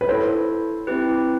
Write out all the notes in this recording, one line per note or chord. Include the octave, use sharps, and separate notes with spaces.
B4
E4 A4 C5 C#5
C4 E4 G4 B4